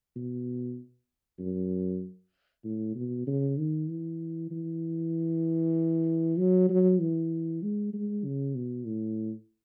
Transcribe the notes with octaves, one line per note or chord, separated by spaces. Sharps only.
B2
F#2
A2
B2
C#3
D#3
E3
E3
F#3
F#3
E3
G#3
G#3
C#3
B2
A2